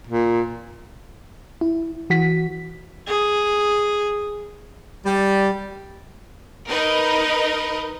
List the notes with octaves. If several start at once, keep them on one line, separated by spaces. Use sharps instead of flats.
A#2
E4
E3 F#4 B6
G#4
G3
D#4 A#4 B4 D#5